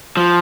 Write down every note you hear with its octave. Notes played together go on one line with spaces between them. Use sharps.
F3